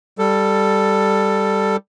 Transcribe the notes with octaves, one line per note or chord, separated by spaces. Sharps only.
G3 A4